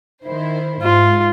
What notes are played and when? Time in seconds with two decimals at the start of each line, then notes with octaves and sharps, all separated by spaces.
0.25 D#3 E4 C5
0.82 G#2 F4